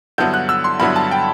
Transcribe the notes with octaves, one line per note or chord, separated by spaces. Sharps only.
G2 D3 F#3 B3 E4 G6
F#6
E6
C6
G2 D3 F#3 B3 E4 B5
A5
G5